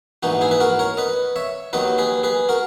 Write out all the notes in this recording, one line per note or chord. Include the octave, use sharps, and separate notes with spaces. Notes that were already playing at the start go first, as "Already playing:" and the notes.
A#1 G#2 E3 D#4 F#4
E4 G#4
B4
F#4 A#4
A#4 C#5
B4 D#5
C#5 E5
D#2 D#3 F#3 B4 D#5
G#4 B4
G#4 B4
F#4 A#4